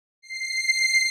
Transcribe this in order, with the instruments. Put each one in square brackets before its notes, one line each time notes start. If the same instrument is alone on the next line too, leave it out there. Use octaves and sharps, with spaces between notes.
[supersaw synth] C7